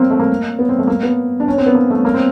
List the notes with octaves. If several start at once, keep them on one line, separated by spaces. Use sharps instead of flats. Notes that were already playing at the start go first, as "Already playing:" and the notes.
Already playing: A#3 C4
A3
A#3
B3
C4
A3
A#3
B3
D4
C#4
C4
B3
A#3
A3
A#3
C4